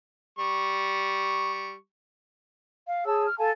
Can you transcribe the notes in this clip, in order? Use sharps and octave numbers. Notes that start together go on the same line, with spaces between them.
G3 C#6
F5
G#4 C#5 A5 E6
F6
A4 F5 G#5 A5